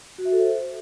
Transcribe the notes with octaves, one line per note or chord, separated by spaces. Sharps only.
F#4
E5
A4
C5